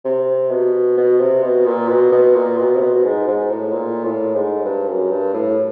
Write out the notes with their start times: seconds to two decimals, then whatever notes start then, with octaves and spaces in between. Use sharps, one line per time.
0.05 C3
0.51 B2
0.97 B2
1.20 C3
1.43 B2
1.66 A#2
1.88 B2
2.12 B2
2.35 A#2
2.58 B2
2.76 C3
2.81 B2
3.04 G#2
3.28 G#2
3.50 A2
3.72 A#2
4.04 A2
4.35 G#2
4.65 G2
4.88 F#2
5.11 G2
5.33 A2